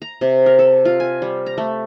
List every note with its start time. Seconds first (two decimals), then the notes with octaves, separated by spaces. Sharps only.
0.02 A#5
0.21 C3
0.46 A#4
0.59 A4
0.85 F4
1.00 G#5
1.22 G3
1.46 A#5
1.58 A3